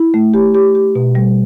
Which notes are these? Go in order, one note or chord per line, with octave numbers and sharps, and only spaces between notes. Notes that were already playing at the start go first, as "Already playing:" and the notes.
Already playing: E4
A3
G4
G4
G4
B2
G3